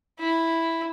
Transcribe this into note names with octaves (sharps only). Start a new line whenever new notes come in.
E4